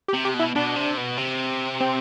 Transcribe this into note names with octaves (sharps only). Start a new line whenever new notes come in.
G4
C3
G4
B2
E4
B2 D4
C3
B2
C3
C4